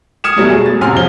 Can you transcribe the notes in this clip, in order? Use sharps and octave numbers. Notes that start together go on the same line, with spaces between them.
D#6 F6 G#6 C#7 E7
B2 F#3 G3 A3
G#4
A6
A1 C3 G#5 C6 F6
E1 F3 G7